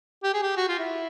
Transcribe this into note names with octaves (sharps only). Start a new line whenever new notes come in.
G4
G#4
G4
F#4
F4
E4